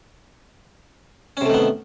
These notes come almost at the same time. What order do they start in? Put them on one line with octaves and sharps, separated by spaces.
C#4 C3 A3 D#3 B3